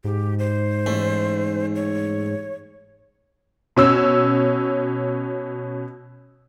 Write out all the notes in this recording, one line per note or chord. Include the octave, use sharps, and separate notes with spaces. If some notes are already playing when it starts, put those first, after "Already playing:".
G#2 G4
C5
A1 A3
C#5
B2 C#4 E6